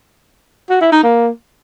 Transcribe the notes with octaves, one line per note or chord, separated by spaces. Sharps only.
F#4
E4
D#4
A#3